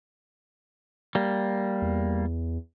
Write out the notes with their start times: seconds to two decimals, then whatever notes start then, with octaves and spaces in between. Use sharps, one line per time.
1.15 G3 A#3
1.82 E2